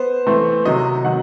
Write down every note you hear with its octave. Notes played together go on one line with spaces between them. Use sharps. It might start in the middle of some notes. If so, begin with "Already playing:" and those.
Already playing: B3 C5
E3 A3 C4
C3 D#3 F#3 D#5
D#3 F#3 F#5